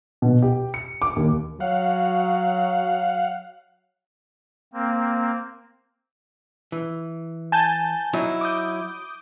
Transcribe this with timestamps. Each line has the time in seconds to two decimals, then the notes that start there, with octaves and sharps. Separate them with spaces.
0.22 B2
0.42 G4
0.74 C#7
1.02 D6
1.16 D#2
1.60 F#3 F5 F#5
4.73 A#3 C4
6.72 E3
7.52 G#5 A5 G6
8.13 F#3 D#4 E4
8.41 D6 D#6 G6